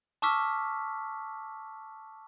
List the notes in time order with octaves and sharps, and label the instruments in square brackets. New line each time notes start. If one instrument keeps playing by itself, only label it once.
[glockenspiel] A5 C#6 D6 E6 F6 B6